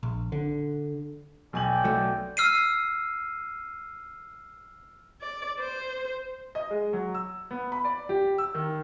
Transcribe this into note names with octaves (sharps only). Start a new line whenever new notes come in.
A#1
D3
B1 D5 G5 G#5 F#7
F#3 A3
E6 F6 C7 D#7
D5
C5
D#5
G#3
F#3
E6
B3
B5
D5
G4
E6
D#3